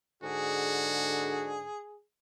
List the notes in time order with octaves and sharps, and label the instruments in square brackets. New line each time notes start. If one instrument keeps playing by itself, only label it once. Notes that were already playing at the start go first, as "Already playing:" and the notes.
[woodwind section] G#2 D3 [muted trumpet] F#4 [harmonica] G#4